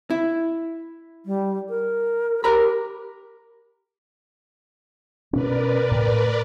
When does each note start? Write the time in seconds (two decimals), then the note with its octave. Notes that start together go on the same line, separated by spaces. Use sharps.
0.10 E4
1.26 G3
1.69 A#4
2.44 G4 A#4 A#5 B5
5.33 B2 C#4 A#4 B4 D5
5.91 A2